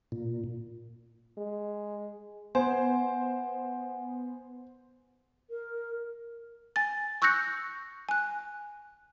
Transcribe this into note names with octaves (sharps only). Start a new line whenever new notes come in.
A#2
G#3
B3 C5 F#5 G#5
A#4
G#5 A6
C#6 E6 F#6 G6 A#6 C#7
G#5 F#6